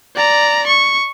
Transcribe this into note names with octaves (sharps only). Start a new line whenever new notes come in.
D5 A#5
C#6